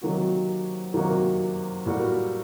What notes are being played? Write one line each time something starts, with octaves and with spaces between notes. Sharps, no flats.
C3 D#3 F#3 A#3 F#4
C3 D#3 F#3 A#3 F#4
A2 G3 A#3 F#4 A#4